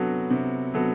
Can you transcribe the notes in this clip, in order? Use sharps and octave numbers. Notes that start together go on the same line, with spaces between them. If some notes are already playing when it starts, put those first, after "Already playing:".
Already playing: C3 F#3 B3 F#4 A4
C3
F#3 B3 F#4 A4